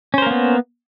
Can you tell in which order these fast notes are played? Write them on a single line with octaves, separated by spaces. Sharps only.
C#4 C5 A#4 A#3 B3